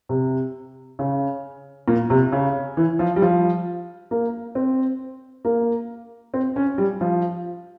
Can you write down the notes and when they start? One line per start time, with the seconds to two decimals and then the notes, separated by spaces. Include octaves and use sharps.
0.09 C3
0.99 C#3
1.88 A#2
2.10 C3
2.32 C#3
2.77 E3
2.99 F3
3.16 G3
3.22 F3
4.11 A#3
4.55 C4
5.45 A#3
6.34 C4
6.56 C#4
6.78 G3
7.01 F3